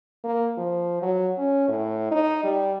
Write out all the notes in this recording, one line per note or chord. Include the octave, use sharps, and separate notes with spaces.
A#3
F3
F#3
C#4
A2
D#4
G3